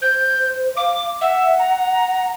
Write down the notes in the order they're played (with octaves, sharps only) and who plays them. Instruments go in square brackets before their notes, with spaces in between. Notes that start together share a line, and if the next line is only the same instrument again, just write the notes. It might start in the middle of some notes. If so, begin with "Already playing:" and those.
[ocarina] C5 [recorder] G6
[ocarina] F5 [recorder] D6
[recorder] E5 [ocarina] F#5
[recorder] A#5